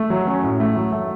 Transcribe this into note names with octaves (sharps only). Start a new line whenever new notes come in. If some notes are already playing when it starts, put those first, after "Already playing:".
Already playing: A3
F#3
C#4
A2
A3
F#3
A3